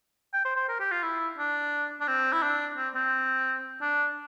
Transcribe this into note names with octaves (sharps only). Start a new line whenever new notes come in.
G5
C5
C5
A#4
G4
F4
E4
D4
D4
C4
E4
D4
C4
C4
D4